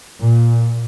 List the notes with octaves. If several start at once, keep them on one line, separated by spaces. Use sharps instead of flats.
A#2